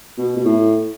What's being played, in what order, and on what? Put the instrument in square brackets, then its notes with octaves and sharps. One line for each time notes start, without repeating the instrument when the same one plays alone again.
[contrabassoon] B2
B2
A2